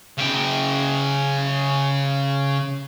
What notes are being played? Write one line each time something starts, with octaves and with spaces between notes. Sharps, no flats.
C#3 G5